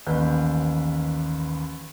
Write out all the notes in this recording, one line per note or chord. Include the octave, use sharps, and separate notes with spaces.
A1 D#2 B4 G6